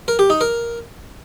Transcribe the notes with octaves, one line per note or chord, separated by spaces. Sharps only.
A#4
G4
D#4
A#4